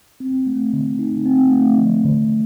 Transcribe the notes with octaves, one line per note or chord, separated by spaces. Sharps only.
C4
A3
D3
D#4
C4
A3
F3
D3